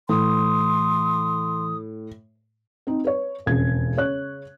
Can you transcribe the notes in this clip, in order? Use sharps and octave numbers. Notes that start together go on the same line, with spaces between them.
A2 E3 C6 D#6
C4 D#4
B4 C#5
E1 F2 C#3 G#6
C#3 C#5 F#6